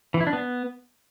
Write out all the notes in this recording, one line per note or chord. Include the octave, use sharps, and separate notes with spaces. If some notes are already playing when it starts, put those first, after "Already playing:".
E3
E4
D4
B3